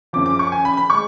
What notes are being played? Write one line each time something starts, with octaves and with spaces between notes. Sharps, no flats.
F#2 C#3 F3 D6
D6
C#6
G#5
B5
B5
G#3 C#6